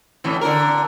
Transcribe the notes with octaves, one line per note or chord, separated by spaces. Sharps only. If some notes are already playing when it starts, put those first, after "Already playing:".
F2 A2 E3
D3 A#4